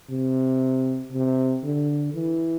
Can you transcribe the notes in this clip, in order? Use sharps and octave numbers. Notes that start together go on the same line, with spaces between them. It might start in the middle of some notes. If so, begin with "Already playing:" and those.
C3
C3
D3
E3